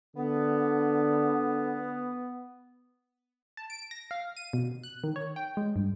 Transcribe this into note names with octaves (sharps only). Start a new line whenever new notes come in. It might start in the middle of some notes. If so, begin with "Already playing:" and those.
D3 B3
A5
D7
A#6
F5
D#7
B2
F#6
D#3
C#5
G5
G#3
G2